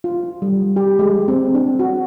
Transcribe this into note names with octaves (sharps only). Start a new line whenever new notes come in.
F4
G3
G4
G#3
C4
D4
F#4